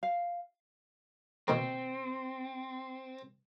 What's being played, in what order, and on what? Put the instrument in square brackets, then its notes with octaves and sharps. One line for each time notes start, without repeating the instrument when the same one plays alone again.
[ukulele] F5
[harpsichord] B2 D#3 A#3 [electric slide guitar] C4